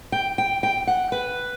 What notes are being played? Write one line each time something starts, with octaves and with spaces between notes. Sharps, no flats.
G5
G5
G5
F#5
B4